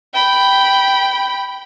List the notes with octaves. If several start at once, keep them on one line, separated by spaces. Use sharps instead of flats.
G5 B5